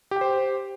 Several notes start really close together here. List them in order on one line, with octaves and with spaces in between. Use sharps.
G4 G5 C5